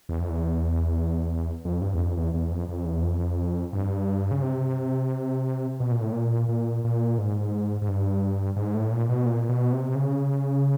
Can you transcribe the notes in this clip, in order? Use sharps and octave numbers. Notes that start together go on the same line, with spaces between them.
E2
F2
E2
F2
G2
E2
F2
E2
E2
F2
F2
E2
F2
G2
C#3
C3
B2
A#2
A2
A#2
A#2
A#2
G#2
G#2
G2
G#2
A2
A#2
B2
A#2
B2
C3
C#3